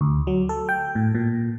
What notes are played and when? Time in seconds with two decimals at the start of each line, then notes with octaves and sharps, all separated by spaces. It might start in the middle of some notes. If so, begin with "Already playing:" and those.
0.01 D2
0.27 F#3
0.49 A4
0.69 G5
0.95 A2
1.15 A#2